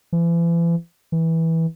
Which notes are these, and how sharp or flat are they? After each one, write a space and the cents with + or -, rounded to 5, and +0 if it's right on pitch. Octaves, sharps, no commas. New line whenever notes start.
E3 +40
E3 -15